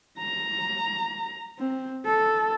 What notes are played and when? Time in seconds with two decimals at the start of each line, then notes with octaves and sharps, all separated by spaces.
0.18 A#5
1.59 C4
2.06 A4